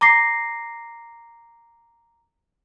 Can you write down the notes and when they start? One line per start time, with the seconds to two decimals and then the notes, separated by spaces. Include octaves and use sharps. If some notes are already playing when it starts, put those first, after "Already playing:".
0.01 A#5 D6 A#6 C7